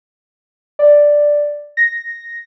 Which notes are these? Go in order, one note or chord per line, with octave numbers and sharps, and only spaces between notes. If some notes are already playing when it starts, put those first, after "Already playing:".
D5
A#6